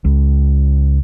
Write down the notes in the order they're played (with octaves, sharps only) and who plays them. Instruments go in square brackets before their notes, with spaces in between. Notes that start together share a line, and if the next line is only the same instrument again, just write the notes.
[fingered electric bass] C#2